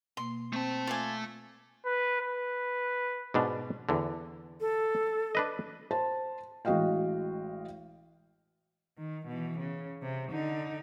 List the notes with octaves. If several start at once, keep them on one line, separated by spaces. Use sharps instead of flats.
B2 A#3 C6
A3 C4 A5
F4 D5 G#5
B4
B4
G#2 B2 D4
E2 D3
A4
D4 B4 D#5
C5 A5
A1 G#3 F#4 D#5 F5 G5
D#3
B2 E3
C#3
C3
D3 D#4